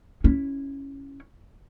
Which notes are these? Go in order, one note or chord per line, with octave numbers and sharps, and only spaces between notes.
C#4 E4